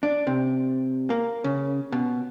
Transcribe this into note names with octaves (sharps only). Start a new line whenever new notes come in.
D4
C3
A#3
C#3
B2